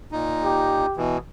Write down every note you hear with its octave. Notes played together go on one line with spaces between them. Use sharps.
A#2 D#4
G4
B2 E3